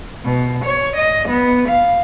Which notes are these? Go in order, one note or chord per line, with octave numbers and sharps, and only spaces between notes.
B2
C#5
D#5
B3
F5